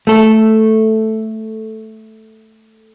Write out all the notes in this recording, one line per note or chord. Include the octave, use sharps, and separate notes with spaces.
A3 A4